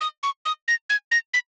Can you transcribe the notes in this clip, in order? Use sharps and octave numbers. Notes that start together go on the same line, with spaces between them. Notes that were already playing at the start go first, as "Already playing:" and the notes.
D#6
C#6
D#6
A#6
G#6
A#6
B6